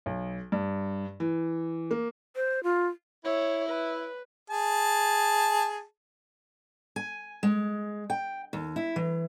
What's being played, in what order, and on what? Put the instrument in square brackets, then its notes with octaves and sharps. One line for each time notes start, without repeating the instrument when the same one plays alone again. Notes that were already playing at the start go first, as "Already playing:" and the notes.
[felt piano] B1
G2
E3
A#3
[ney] C5
F4
[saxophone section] E4 [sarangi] C#5
[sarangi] B4
[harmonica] G#4 A5
[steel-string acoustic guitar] G#5
G#3
G5
D#2
E4
E3